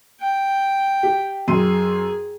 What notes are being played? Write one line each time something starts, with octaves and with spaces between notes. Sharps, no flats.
G5
G4
F#2 G#4 C6 D#7